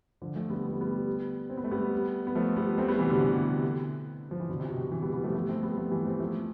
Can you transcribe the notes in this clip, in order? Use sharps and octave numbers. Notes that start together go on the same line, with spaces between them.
D3 F3
F3 A3
G3 B3
B3
A3
G3 B3
C4
B3
A3
G3 B3
B3
F3 A3
G3 B3
A3 C4
G3 B3
C3 E3
B2 D3
C3
C3
F3
E3
B2 D3
C3
B2
C3
B2
C3 E3
G3 B3
G3 B3
F3 A3
F3 A3
A3 C4
G3 B3
F3 A3
E3 G3
A3 C4
F3 A3